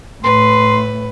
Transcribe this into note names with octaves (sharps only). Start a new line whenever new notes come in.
A2 B4 C6